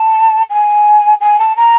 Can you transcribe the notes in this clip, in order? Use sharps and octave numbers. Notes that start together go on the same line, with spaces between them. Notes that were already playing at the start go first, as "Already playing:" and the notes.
Already playing: A5
G#5
G#5
A5
A#5